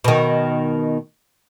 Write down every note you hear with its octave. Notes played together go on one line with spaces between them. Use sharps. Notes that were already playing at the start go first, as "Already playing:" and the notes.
B2 D#3